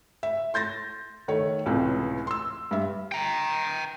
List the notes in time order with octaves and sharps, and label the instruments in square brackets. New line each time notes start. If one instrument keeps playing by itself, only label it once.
[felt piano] E5
C6 G6 A6 A#6
D#3 A3 C#5
C#2 A2 C3 E3
C6 E6
G2 E5
[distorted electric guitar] G5 A#5